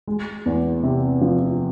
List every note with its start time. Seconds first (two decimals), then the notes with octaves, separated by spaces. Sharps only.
0.08 G#3
0.46 E2
0.83 C3
1.21 F3